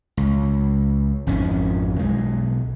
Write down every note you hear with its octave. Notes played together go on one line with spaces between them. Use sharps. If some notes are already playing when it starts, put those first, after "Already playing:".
C#2
G#1 F2 D#3 C#4
B1 G#3